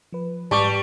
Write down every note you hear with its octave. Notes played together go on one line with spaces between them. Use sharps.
F3 B4
G#2 G3 B4 A5 C#6 D6